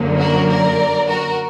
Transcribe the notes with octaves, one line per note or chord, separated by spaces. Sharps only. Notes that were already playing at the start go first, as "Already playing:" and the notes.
Already playing: F#2 D3 F#3 A#3
F#4 A#4
A#4 D5
F#4 A#4